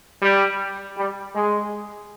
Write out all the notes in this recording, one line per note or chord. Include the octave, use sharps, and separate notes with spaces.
G3
G3
G#3